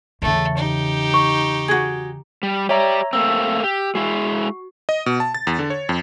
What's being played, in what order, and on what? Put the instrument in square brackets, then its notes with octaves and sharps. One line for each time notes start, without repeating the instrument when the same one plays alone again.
[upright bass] E2 C#3 [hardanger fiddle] A3
[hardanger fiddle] D#4 G4
[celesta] C#6
[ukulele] F#4 G#4
[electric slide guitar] G3
[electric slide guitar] G4 D5 [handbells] C#5 E5 A#5
[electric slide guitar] A3 A#3 C4 [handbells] E6
[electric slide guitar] G4
[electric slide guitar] G#3 E4 [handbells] F#4
[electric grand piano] D#5
B2
A5
A6
E2
D3
C#5
F2